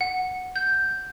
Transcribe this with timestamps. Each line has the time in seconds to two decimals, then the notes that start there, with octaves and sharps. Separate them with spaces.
0.01 F#5
0.56 G6